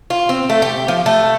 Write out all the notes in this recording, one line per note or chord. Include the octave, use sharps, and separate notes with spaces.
F4
C4
A3
G4
F3
A3